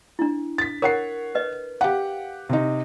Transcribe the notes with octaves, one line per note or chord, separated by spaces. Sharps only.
D4 E4
A6 B6
A#4 C#5 F#5 C7
B4 D#5
G4 F5 F#5
C3 D#4